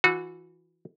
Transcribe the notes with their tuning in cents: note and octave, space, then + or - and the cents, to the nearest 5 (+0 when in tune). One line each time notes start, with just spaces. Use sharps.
E3 +0 F#4 -30